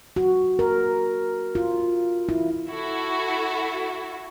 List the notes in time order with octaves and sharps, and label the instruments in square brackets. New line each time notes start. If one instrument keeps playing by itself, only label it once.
[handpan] F#4
A#4
F4
E4
[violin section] E4 F#4 A4